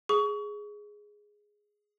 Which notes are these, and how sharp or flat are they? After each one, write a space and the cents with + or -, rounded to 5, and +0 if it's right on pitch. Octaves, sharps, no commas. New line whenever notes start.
G#4 +0 C#6 +25